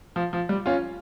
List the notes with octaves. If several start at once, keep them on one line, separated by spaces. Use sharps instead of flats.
F3
F3
G3
C#4 F4